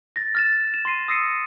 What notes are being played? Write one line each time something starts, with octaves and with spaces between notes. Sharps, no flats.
A6 A#6
F6 A6 E7
E7
C6 A#6 C7 D#7
D#6 E6 A#6 C7 C#7 D#7